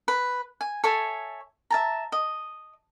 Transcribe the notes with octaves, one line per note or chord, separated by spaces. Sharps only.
B4
G#5
A4 C#5 E5 G#5
E5 A5 A#5
D#5